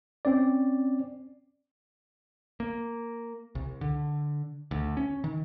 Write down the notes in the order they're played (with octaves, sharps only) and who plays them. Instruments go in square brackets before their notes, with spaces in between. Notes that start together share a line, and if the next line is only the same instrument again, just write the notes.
[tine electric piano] C4 C#4 D5
[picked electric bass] A#3
C2
D3
D2
C#4
D#3